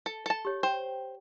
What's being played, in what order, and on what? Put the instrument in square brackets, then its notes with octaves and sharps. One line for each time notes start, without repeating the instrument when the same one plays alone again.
[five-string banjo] A4
A4 A5
[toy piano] G4 C#5
[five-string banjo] C5 [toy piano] G5